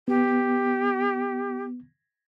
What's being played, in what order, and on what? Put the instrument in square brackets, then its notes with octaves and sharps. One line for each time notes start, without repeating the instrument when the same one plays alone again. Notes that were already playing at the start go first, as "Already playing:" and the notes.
[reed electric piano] B3 [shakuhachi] G4